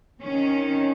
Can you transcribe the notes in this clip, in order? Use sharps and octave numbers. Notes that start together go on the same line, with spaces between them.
C3 D#3 C#4